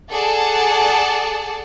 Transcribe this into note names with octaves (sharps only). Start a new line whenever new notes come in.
G#4 A4 D5 F#5 A5